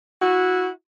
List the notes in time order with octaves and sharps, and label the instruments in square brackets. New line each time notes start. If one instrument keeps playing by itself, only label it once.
[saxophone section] E4 F#4